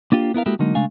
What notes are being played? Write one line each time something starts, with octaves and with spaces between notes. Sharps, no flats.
A#3 D4 F4 G4
B3 E4 A#4 F5
G#3 A#3 E4 F#4 G4 A4
D3 F#3 G#3 A#3 D#4
C#3 G#3 A3 D4 F5 G#5